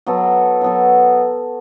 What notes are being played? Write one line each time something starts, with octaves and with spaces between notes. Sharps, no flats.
F#3 B3 F#4 A4
F#3 B3 F#4 A4